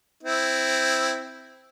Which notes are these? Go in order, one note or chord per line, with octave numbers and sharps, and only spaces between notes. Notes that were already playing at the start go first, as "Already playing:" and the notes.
C4 E4